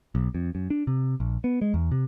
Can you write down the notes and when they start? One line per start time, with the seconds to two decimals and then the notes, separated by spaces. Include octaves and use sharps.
0.15 B1
0.35 F2
0.55 F#2
0.70 D4
0.87 C3
1.20 A#1
1.44 B3
1.61 G#3
1.74 E2
1.91 C3